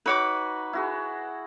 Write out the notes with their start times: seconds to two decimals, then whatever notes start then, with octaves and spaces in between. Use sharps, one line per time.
0.06 D#4 F#4 B4 C#5 D6
0.73 E4 F#4 G#4